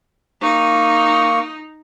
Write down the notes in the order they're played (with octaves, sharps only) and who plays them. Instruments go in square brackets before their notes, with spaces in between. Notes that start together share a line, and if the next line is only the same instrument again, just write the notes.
[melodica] A#3 C#6 [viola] D#4